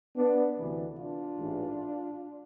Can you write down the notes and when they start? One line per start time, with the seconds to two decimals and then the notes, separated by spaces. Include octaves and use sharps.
0.17 B3 D4
0.58 D2 C3 E3
0.98 D4 F4
1.38 A1 G#2 E3